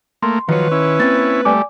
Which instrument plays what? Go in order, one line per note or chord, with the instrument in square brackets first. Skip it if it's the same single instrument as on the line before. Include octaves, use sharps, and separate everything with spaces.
[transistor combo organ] A3 A#3 [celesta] C6
[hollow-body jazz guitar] D#3 C#5 [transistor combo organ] F3 F#3 [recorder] B4
[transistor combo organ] C#4 E4
[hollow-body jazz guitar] A#3 C4 [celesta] A6
[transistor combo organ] G3 A3 [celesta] D5 G#5 D6